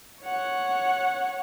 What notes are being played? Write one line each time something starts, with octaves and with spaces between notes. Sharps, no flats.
C#5 F#5